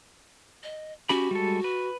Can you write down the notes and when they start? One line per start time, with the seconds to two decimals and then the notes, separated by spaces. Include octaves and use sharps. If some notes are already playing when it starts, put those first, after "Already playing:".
0.63 D#5
1.09 C#4 F#4 G4 B5
1.31 G3 G#3 A4
1.64 B4